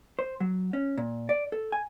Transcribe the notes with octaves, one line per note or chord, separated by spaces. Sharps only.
C5
F#3
C#4
A#2
D5
A4
G#5